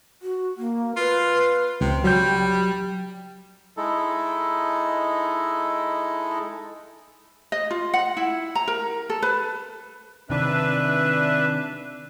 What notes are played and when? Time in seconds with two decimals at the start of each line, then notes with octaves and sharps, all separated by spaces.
0.22 F#4
0.57 A#3
0.97 F4 B4
1.81 C#2 C3 G5
2.04 F#3 G3 G6
3.77 G#3 D#4 E4 A4
7.52 D#5
7.71 F4
7.94 F#5
8.17 E4
8.55 A#5
8.68 A#4
9.10 A4
9.22 B4
10.30 C3 D#3 D4 B4 E5